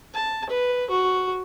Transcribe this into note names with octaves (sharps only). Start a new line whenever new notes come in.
A5
B4
F#4